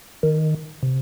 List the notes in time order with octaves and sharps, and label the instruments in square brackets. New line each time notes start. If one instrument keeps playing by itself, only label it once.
[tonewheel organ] D#3
C3